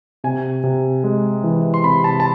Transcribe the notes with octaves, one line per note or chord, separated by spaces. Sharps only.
C3 G#5
C3
G#3
E3
C6
C3 B5
A5
A5